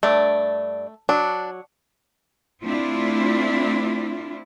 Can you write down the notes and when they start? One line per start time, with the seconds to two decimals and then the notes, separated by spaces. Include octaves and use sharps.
0.03 G2 A3 D5
1.09 F#3 D4
2.64 A3 C4 D4 E4 F4